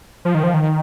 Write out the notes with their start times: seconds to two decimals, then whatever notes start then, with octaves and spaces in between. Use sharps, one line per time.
0.25 F3
0.35 D#3
0.43 F3
0.54 D#3